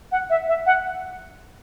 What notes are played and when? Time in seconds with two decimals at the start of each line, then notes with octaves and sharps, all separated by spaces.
0.12 F#5
0.30 E5
0.48 E5
0.66 F#5